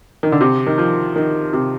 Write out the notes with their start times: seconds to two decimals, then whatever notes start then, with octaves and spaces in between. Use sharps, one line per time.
0.23 D#3
0.32 D3
0.41 C3
0.67 D#3
0.78 F3
1.16 D#3
1.53 C3